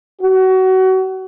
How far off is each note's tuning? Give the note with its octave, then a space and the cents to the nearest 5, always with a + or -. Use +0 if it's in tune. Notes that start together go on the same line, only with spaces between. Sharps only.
F#4 +25